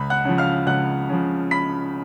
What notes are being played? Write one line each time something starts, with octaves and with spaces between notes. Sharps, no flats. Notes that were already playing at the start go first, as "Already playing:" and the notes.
Already playing: C#2 B5
F#5 F#6
C#3 F3
F5 F6
C#2 F#5 F#6
C#3 F3
B5 B6